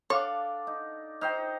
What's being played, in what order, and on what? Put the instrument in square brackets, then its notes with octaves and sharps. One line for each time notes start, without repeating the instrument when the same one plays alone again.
[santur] D4 D5 D6 [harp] A4 F5 F#5 [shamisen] C#5
[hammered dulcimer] D#4
[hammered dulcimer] D#4 C5 G5 [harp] F6